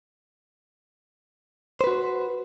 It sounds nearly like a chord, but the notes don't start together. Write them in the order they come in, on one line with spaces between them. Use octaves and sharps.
C5 B4 F#4